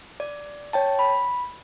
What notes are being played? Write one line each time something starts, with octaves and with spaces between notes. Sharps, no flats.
D5
C#5 G5 A5
B5